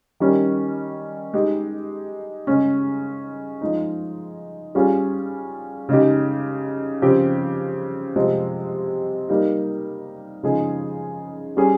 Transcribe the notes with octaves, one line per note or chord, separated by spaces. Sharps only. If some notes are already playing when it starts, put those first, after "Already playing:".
D#3 G3 C#4
G#3 D#4 G4
C#3 G#3 C#4
F3 G#3 D#4
G3 C#4 F4 G#4
C#3 G#3 D#4 G4
C#3 F3 C4 G4
C3 F3 G#3 C4
G3 A#3 D#4
C#3 F3 G#3 D#4 G#4
G3 C#4 G#4